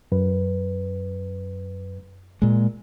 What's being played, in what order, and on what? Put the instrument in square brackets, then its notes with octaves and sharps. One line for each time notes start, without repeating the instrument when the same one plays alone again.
[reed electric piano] F#2 B4
[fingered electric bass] A#2 G#3